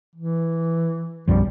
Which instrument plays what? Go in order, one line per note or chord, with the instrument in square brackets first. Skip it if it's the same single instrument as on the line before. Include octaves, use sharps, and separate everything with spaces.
[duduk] E3
[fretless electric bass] B1 F#2 F3 [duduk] G3